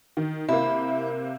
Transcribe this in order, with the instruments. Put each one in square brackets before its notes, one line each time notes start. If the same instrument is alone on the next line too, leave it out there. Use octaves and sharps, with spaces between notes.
[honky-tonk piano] D#3
[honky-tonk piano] C3 A#3 [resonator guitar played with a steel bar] E4